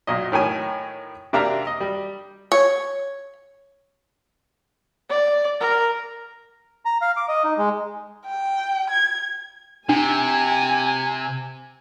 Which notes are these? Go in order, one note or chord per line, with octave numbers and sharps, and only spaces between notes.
B1 A#2 D#5
A2 D#3 C#5 G#5
C3 A#3 D4 E5 F5 A#5
D#5
G3
C#5
D5
A#4
A#5
F5
D6
D#5
D#4
G#3
G5
G#6
C3 D4 G#5